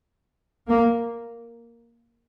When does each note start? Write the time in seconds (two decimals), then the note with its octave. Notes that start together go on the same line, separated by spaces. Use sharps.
0.69 A#3